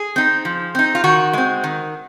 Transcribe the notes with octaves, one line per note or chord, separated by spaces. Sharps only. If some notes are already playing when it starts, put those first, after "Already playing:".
Already playing: G#4
C4 D#4
F3
C4 D#4
F4
D#3 F#4
G#3 C4
D#3